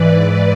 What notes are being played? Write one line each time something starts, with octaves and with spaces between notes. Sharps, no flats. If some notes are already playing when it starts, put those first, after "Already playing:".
Already playing: G#2 E3 B4 D5